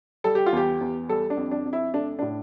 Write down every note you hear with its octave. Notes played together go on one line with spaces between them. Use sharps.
G3 A4
G4
F4
E2 G4
E2
G3 A4
D4
F2
D4
F2
E4
A3 D4
A2 D4